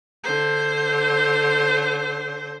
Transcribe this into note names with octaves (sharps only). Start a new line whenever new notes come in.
D3 C5